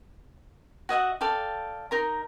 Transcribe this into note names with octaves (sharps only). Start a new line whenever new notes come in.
F#4 D#5 E5 F#5
A4 D5 F5 G5
D#4 A#4 A#5